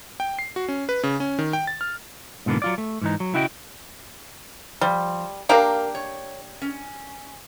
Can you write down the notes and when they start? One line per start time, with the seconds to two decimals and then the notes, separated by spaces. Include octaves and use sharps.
0.20 G5
0.39 C7
0.56 F#4
0.68 C#4
0.89 B4
1.03 C#3
1.20 C#4
1.39 D#3
1.53 G5
1.67 A6
1.81 F6
2.46 G#2 B2 D3 E3 A#3
2.62 F#3 F4 D5
2.78 A3
3.02 G#2 E3 D#4
3.20 F#3
3.34 C#3 E4 F#4 D#5 G5
4.81 F3 G3
5.49 A#3 D4 G4 A#4 F5
5.95 C#5
6.62 C#4